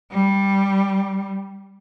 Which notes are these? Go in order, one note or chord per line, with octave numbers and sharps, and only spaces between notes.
G3